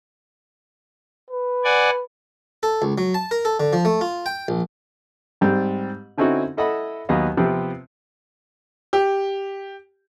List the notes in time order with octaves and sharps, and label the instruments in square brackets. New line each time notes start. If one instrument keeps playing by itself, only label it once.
[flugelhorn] B4
[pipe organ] D5 F#5 G#5
[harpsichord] A4
C#2
F#3
A5
A#4
A4
D3
F3
A3
F4
G5
A#1
[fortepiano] G#2 G3 C4
D3 C4 C#4 D#4 E4 F#4
E4 A4 D#5 E5 F#5 B5
D#2 F#3 B3 D#5 F5
C3 F3 B3 C4
[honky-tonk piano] G4